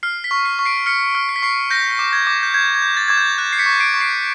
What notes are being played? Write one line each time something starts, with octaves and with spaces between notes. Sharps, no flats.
F6 C7
B6
C#6
C7
C#6
C7 D7
C7
F6 B6 C#7
F6
C7
B6
C#6 C7
G6 A#6
D6
G#6
D6
G6
G6 G#6
G#6
G6
A6
D6 G#6
G6
F#6
C7
B6 C#7
C#6
C7 D7
C#6
C7 D7